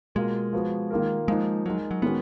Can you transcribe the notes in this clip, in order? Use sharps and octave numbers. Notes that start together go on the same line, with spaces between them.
B2 G#3 A#3 F4 A#4
F3 B3 F#4
D#3 A#3 F4 A#4
F3 G#3 A#3 D#4
F#3 G#3 D#4 A#4
F#3
D#3 G#3 B3 C#4 F#4